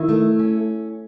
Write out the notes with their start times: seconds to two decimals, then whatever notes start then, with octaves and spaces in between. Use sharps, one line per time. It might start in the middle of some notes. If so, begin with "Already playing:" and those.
Already playing: D#3 E4
0.09 A3
0.39 C#4